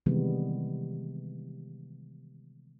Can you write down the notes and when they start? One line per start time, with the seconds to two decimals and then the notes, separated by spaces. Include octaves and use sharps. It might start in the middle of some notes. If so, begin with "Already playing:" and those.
0.06 C3 D#3 E3 G3 G#3 B3